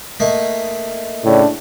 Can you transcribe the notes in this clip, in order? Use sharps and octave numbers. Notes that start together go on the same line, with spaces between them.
A3 A#3 D#4
A2 C#3 D4